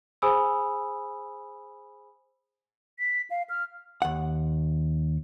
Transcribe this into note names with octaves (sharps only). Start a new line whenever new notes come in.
G#4 C5 G#5 B5 D#6 E6
B6
F5
F6
D#2 F#5